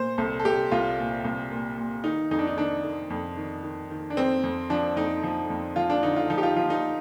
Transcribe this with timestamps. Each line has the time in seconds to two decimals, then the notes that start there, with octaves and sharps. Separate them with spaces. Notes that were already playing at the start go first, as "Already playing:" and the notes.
Already playing: A#2 C5
0.18 C2 A4
0.40 A4
0.45 C2 G4
0.72 C2 F4
0.98 A#2
1.25 C2
1.51 A#2
1.77 A#2
2.04 D#3 D#4
2.31 F2 D#4
2.39 D4
2.47 D#4
2.57 D#3 D4
2.84 D#3
3.10 F2
3.37 D#3
3.64 D#3
3.91 D#3
4.10 D4
4.17 F2 C4
4.43 F2
4.70 F3 D4
4.96 F2 D#4
5.23 F3
5.50 F2
5.76 F3 F4
5.90 D4
6.03 D3 D#4
6.16 F4
6.30 F3 D#4
6.38 G4
6.43 F4
6.56 F3 F4
6.70 D#4